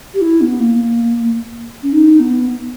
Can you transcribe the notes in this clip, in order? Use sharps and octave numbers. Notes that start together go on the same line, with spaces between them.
G4
E4
B3
A#3
C#4
D#4
B3